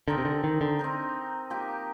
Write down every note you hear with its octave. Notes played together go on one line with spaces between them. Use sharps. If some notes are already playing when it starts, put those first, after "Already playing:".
D3 C4 D#4 A#4
C3
D3
D#3
D3
C4 D#4 A#4
F3 A#3 D#4 G4